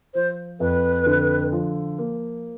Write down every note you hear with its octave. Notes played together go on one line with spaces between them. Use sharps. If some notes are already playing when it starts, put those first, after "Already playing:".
F3 C5
F2 B4
D3
F3
A#3